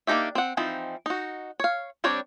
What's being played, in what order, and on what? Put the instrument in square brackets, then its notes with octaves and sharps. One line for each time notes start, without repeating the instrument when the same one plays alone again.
[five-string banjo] A#3 D4 D#4 G4 E5
C4 F#5
E3 F3 C4 D#4
D#4 F#4
C#5 F5
G3 C4 D4 C#5